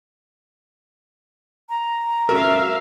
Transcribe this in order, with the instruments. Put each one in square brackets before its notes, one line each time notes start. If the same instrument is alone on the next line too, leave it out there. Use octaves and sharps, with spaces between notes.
[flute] A#5
[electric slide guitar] C#4 F#4 A4 [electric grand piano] A#4 [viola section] E5 F5